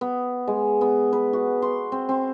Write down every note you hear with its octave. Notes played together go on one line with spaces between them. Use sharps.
B3
G#3
B3
B4
F#4
C6
C4
C4